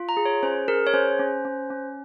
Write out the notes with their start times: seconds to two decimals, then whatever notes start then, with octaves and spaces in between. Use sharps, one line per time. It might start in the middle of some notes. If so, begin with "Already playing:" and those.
Already playing: F4
0.09 A#5
0.17 G#4
0.25 C#5
0.43 C#4 C5
0.68 G#4 A#4
0.87 C#5
0.94 C#4 C5
1.19 C#4
1.45 C#4
1.70 C#4